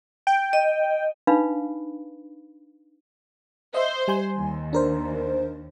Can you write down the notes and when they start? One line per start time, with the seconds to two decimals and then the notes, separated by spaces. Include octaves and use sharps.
0.27 G5
0.53 D#5
1.27 D4 D#4 B4 F5 B5
3.74 C5 D#5 E5
4.08 G3 G#5 C6
4.37 D#2
4.73 D4 A#4 C5